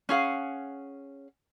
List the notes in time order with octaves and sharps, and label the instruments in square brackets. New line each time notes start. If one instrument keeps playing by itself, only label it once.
[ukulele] C#4 G#4 F5 F#5